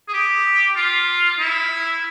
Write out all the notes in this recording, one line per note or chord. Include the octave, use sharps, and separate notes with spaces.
G#4
G4
F4
E4